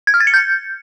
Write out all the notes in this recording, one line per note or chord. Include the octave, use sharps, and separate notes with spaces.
G#6
F6
A6
C#7
G6